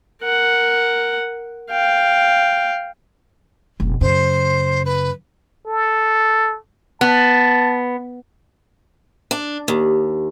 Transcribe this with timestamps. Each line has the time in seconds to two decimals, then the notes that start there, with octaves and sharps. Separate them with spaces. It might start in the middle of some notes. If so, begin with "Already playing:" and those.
0.22 A#4 F#5
1.71 F5 G5
3.80 F1 B2
4.01 F#2 C#3 C5
4.85 B4
5.67 A4
7.01 B3 A5
9.31 D4
9.68 D#2